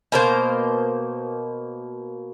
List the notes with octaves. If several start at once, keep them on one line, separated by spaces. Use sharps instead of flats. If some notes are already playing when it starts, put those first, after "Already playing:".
B2 A#3 C5